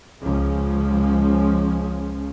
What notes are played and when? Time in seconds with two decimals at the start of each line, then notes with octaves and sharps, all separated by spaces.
0.21 C#2 F3 G#3 C#4